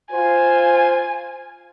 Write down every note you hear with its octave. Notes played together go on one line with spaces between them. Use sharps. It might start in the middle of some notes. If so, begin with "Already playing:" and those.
F4 C5 G#5